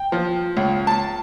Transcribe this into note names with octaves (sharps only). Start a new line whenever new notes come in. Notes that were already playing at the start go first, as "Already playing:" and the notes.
Already playing: G5
F3
C#2
A5